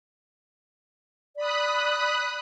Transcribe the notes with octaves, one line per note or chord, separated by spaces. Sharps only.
D5 B5 D#6 F#6